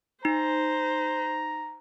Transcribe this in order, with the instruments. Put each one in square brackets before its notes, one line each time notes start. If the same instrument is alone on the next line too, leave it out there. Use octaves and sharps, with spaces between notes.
[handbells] D#4 [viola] C5 [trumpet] A#5